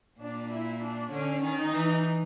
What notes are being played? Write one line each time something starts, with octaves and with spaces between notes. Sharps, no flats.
A#2 D4
E4
D4
D3 C#4
D#3
D#4
E3